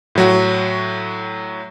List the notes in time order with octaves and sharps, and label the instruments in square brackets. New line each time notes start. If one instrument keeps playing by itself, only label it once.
[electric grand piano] A2 F#3 F#4